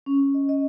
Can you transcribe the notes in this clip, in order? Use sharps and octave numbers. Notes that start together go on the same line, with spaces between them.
C#4
C#4
D#5
D#5